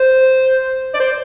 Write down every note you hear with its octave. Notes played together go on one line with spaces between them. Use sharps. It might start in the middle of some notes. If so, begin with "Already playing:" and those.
Already playing: C5
D5
C5